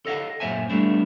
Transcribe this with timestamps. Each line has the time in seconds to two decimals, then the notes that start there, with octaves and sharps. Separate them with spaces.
0.06 A4 D#5 F5 F#5
0.40 F#2 A#2 C#4 C5 E5 G#5
0.70 G3 A3 B3 D4 E4